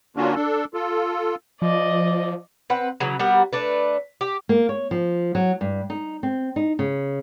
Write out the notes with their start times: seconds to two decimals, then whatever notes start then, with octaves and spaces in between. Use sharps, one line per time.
0.17 D3 A#3 C#4 D4 F4 F#4
0.35 D4 A4
0.74 F4 A4
1.62 F3 D5 D#5
2.70 C4 B4 F#5
3.00 C#3 E3 F#3
3.19 G3 B3 F#4 A#4
3.53 A3 D4 B4
4.21 G4
4.49 A#3
4.69 C#5
4.91 F3
5.35 F#3
5.61 G2
5.90 D#4
6.23 C4
6.56 D#4
6.79 C#3